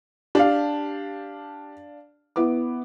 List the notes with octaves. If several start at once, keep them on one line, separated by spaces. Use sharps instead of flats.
D4 G4 F5 A5
B3 E4 D6